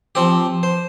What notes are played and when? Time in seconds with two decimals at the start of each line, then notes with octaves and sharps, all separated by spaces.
0.15 F3 C4 G4
0.63 C5